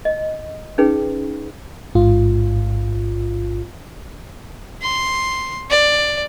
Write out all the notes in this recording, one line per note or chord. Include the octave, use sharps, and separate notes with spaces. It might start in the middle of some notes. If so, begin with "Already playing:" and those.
D#5
C#4 D#4 G#4 B4 G5
A1 G#2 F4
C6
D5